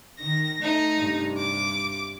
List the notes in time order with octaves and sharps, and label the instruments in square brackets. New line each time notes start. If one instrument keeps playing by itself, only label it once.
[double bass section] D#3 [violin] A#6
[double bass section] A3 [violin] D#4
[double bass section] G2 C3
[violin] D6